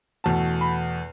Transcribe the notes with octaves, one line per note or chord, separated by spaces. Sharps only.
E2 B2 A3 A5
B5